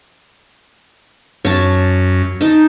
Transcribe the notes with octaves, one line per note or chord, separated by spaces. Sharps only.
F#2 C#5 A5
D#4 A5